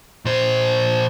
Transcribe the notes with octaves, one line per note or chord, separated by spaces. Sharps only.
A#2 C5